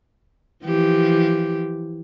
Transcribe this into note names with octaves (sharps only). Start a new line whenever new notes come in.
E3 F3 G4